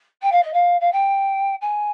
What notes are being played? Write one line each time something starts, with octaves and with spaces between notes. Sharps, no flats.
G5
F5
D#5
F5
F5
G5
G#5